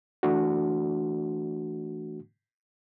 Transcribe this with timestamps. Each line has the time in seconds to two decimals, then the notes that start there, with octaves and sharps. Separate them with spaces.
0.23 E3 A3 D4 F#4